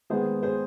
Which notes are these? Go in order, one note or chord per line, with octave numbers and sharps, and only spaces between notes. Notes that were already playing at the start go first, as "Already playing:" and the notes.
D#3 G#3 B3 G#4 C5
G#4 C5